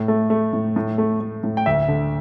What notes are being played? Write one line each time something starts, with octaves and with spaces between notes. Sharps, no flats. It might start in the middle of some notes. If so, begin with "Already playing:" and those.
Already playing: A2
A3
A3
A2
A2
A3
A3
A2
G5
D2 E5
D3